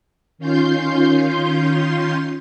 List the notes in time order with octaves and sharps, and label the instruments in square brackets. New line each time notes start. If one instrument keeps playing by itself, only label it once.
[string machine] D#3 C#4 F4 C6 G6